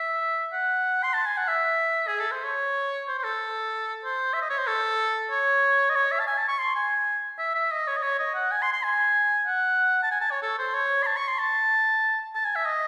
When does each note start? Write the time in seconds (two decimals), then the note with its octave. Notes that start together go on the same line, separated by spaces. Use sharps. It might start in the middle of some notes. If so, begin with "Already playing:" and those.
Already playing: E5
0.53 F#5
1.03 C6
1.14 A5
1.26 G#5
1.37 F#5
1.48 E5
2.07 G#4
2.20 A4
2.32 C5
2.44 C#5
3.08 C5
3.18 C5
3.24 A4
4.04 C5
4.33 E5
4.41 D#5
4.50 C#5
4.58 C5
4.67 A4
5.31 C#5
5.90 D#5
5.95 C#5
6.12 E5
6.20 A5
6.27 G#5
6.37 A5
6.48 C#6
6.59 C6
6.75 G#5
7.39 E5
7.55 E5
7.72 D#5
7.87 C#5
7.97 D#5
8.02 C#5
8.19 D#5
8.35 F#5
8.51 G#5
8.62 C6
8.73 C6
8.83 G#5
9.46 F#5
10.03 A5
10.11 G#5
10.21 A5
10.31 C#5
10.42 A4
10.58 C5
10.74 C#5
11.03 C6
11.06 A5
11.16 C#6
11.28 C6
11.39 A5
12.35 A5
12.45 G#5
12.55 E5
12.66 D#5